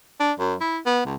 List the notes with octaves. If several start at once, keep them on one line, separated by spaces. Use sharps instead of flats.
D4
F#2
E4
B3
C#2